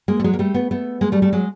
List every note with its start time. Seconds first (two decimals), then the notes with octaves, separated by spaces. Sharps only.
0.08 G#3 A#3
0.20 A3
0.24 F#3 G#3
0.33 A#3
0.39 G3 A3
0.54 A3 B3
0.71 A3 B3
1.01 G#3 A#3
1.12 G3 A3
1.22 G3 A3
1.33 F#3 G#3